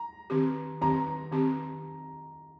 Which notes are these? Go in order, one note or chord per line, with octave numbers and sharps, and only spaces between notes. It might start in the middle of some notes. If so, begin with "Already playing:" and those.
Already playing: A#5
D#3 C4 G4
D#3 C4 G4 A#5
D#3 C4 G4